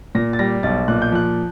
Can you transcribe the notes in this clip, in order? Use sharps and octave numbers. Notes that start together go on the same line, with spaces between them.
A#2 A#6
A6
G3 A#6
B1 A6
A#2 F#6
G6
F3 F#6